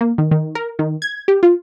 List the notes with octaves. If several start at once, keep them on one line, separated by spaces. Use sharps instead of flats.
A#3
D#3
D#3
A#4
D#3
G#6
G4
F4